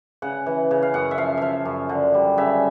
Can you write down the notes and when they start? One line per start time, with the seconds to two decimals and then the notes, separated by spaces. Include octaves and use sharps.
0.22 C#3 F#5
0.46 E3
0.71 C#3
0.82 F5
0.94 F#2 F#5
1.11 E5
1.18 F3 F5
1.38 F3 E5 F5
1.65 F#2
1.89 D3
2.14 G3
2.38 C#3 E5